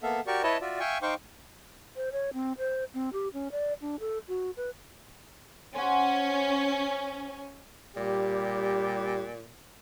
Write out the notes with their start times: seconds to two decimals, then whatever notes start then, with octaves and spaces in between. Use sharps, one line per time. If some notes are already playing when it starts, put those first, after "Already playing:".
0.03 A#3 B3 A4 E5 F5
0.27 F#4 G4 A#4 D5 C#6
0.43 E4 B4 C#5 D#5 E5 A5
0.61 F4 F#4 D5 E5
0.80 E5 F5 G5 G#5 C#6
1.02 D#4 C5 F5 G5 C#6 D6
1.96 C5
2.12 C#5
2.33 C4
2.58 C5
2.94 C4
3.13 G4
3.33 C#4
3.52 D5
3.81 D4
4.00 A4
4.28 F#4
4.57 B4
5.75 C#4 C5 F#5
7.97 A#2 G3 G4